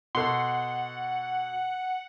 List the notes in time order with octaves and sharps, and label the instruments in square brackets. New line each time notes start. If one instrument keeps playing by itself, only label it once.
[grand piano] B2 A4 [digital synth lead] F#5 [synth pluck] C6